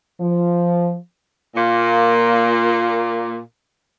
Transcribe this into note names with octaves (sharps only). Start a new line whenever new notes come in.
F3
A#2 A#3